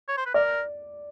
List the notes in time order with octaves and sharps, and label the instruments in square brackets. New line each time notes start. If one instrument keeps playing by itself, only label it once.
[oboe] C#5
C5
B4
[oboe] A#4 [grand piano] D5